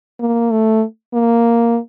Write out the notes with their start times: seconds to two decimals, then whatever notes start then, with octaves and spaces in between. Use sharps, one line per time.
0.20 A#3
0.51 A3
1.13 A#3